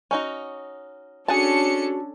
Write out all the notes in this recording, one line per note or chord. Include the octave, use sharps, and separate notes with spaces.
C#4 D#4 F#4
C#4 D4 F#4 G#4 A4 F#5 A5 C#7